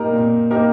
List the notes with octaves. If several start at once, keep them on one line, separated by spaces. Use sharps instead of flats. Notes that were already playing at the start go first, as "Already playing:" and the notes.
Already playing: A#2 A#3 D#4 G4 A#4
A#2
A#3 D#4 G4 A#4